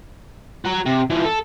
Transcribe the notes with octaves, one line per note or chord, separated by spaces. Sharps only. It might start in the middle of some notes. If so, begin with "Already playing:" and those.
F#4 A#5
C3
E3 F3
A4